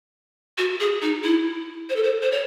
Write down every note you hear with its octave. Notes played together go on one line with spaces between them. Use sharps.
F#4
G#4
D#4
E4
C5
A4
C5
C5
C#5